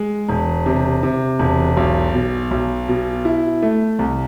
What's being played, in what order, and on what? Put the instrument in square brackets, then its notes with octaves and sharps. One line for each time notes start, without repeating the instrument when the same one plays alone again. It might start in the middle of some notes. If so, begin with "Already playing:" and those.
Already playing: [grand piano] G#3
E1
C3
C3
E1
B1
B2
B1
B2
E4
A3
C2